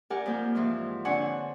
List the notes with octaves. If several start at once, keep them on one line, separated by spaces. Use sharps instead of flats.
G4 A#4 D5 F#5 G#5
F2 A#3 G6
G#2 E3 F3
D3 C4 D4 C#5 F#5 G#5